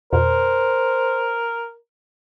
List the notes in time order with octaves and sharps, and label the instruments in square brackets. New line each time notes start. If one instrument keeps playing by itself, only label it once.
[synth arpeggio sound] F2 B2 [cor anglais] A#4 [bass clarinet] C5